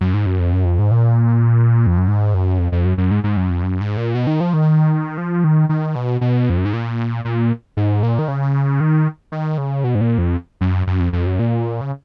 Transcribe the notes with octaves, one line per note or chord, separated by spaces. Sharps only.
F#2
G#2
F#2
F2
F#2
F2
G#2
A#2
F2
F#2
G#2
F#2
F2
F2
F#2
F#2
G#2
G#2
F#2
F2
F#2
G#2
A#2
B2
D#3
F3
D#3
F3
D#3
D#3
B2
B2
F2
F#2
G#2
A#2
A#2
G#2
A#2
D#3
C#3
D#3
D#3
C#3
B2
G#2
A#2
F2
F#2
F#2
F2
F2
F#2
A#2
C#3